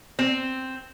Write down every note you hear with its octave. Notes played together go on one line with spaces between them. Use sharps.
C4